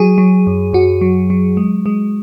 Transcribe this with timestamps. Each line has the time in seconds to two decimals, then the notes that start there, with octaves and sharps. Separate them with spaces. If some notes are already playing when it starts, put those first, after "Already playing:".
Already playing: F#3 G#4
0.18 F#3
0.47 F#2
0.73 F#2 F#4
1.01 F#3
1.30 F#3
1.57 G#3
1.86 G#3